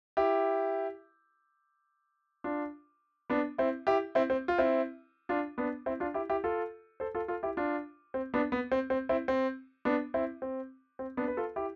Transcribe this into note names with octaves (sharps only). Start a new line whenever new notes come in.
E4 G4
D4 F4
B3 D4
C4 E4
E4 G4
C4 E4
C4
F4
C4 E4
D4 F4
B3 D4
C4 E4
D4 F4
E4 G4
E4 G4
F4 A4
A4 C5
F4 A4
F4 A4
E4 G4
D4 F4
C4
B3 D4
B3
C4
C4
C4 E4
C4
B3 D4
C4 E4
C4
C4
B3 D4
B4
F4 A4
E4 G4